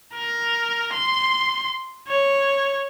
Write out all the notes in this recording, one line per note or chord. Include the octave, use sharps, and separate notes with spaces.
A#4
C6
C#5